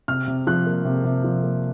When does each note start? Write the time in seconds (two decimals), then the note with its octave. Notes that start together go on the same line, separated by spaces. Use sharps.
0.08 C3 F6
0.28 C3
0.47 F3 F#6
0.67 A#3
0.85 C3
1.04 C3
1.24 F3
1.43 A#3